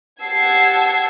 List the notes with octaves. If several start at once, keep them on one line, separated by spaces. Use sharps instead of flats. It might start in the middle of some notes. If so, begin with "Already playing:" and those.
G4 F#5 A5 E6 G#6 C7